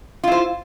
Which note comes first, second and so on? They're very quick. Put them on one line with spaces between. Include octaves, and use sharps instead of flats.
F4 E4 C5